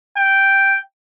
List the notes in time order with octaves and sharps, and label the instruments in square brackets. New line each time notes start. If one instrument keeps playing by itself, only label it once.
[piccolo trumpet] G5